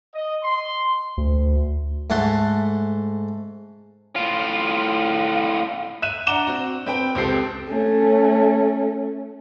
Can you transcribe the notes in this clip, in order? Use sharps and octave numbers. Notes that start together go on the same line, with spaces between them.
D#5
C6
D2
G#2 A3 F#5 C6
A2 F4
E5 F#6 D#7 E7
D4 F#5 A#5 D6 E7 G7
C4 F#4
C4 B4 G5
C#2 C4 G4 A4 C7 D7
A3 C#4